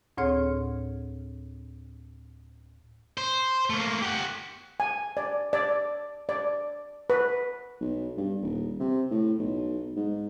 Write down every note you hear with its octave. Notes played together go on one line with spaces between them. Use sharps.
D2 A2 C4 G#4 C#5 F6
C5
A3 A#3
G4 F#5
G#5
D5
D5
D5
B4
B1
G2
D#1
C3
A2
B1
G#2